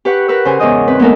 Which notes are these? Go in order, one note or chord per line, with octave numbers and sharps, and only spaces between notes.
G4 B4 F#5 C#6
A#4 B4 E6
C#3 C5 G#5
E2 G#2 C#3 D#5 D#6
C4 B4
G#3 A#3 B3 D#4 A4 A#4